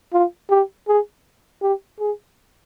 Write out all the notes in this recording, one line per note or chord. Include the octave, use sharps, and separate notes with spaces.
F4
G4
G#4
G4
G#4